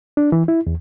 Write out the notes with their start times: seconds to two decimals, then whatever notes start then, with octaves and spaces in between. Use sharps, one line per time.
0.17 D4
0.32 E3
0.48 E4
0.67 E2